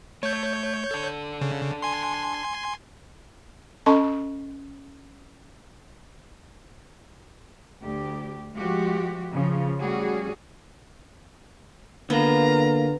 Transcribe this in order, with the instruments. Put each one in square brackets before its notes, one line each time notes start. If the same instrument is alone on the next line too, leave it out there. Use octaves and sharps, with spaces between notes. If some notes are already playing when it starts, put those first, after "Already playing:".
[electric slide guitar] A3 [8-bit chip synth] C#5 G6
[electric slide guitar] D4 A4
[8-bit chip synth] C#3
G#5 C6
[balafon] C#4 A4 D#5 A5 C6 C#6
[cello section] D2 G4
F3 G#3 F#4 G4
C#3 F3
G3 A3 C#4 F#4 G#4
[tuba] D3 [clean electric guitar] A#3 B4 [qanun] B3 [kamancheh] F4 A#5